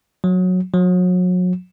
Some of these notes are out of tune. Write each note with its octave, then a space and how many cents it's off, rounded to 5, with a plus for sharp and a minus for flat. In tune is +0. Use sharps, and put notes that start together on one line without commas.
F#3 -15
F#3 -35